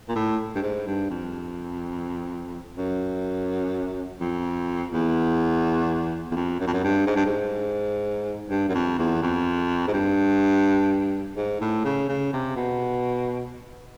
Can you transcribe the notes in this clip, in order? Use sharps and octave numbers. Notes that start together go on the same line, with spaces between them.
A#2
A2
G2
G#2
G2
F2
F#2
F2
E2
E2
F2
F#2
F2
F#2
G2
G#2
G2
G#2
G2
F#2
F2
E2
F2
G#2
G2
G#2
A2
C#3
C#3
C3
B2